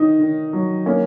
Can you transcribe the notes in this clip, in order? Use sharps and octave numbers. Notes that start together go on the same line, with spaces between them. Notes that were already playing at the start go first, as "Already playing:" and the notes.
Already playing: D#3 D#4
D#3
F#3
A#3 C#4